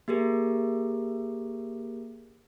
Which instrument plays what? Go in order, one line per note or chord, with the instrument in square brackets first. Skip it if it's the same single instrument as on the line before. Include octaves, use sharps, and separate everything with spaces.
[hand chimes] A#3 G4 G#4 A#4